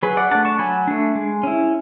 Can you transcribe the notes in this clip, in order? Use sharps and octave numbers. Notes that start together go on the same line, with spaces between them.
F#3 G#4 B4
D5 F#5
A3 D4 F#5 A5
A5 C#6
F#3 G#5 B5
A3 D4
G#3
C#4 E4